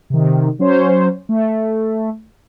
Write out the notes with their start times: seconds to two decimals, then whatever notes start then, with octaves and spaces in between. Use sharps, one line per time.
0.10 C3 D#3
0.59 F#3 C#4 C5 C#5
1.29 A3